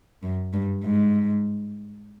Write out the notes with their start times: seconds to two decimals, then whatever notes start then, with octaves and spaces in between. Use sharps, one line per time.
0.23 F#2
0.54 G2
0.84 G#2